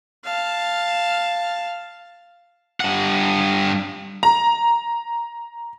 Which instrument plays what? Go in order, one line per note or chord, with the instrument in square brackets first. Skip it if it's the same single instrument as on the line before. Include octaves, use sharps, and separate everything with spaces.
[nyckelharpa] F5 A5
[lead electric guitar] G2 F#5
[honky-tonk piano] A#5